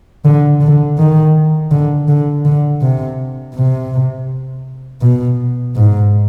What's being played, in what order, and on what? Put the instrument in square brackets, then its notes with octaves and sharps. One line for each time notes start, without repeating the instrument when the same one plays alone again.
[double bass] D3
D3
D#3
D3
D3
D3
C3
C3
B2
G#2